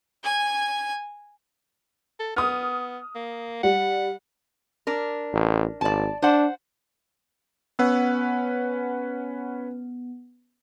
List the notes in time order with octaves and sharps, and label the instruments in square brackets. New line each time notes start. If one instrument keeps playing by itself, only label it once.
[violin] G#5 G#6
[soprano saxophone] A4
[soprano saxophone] B3 [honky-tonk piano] D#6 F6
[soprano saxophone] A#3
[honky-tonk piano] G3 [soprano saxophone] F#5
[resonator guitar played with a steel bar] D4 A#4
[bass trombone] A1
[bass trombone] G#1 [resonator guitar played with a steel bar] D5 A5
[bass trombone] D4 [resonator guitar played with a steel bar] C5 F#5
[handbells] B3 [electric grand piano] C#4 B4 F#5